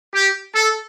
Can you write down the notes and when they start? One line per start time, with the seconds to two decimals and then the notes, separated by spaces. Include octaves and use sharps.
0.14 G4
0.54 A4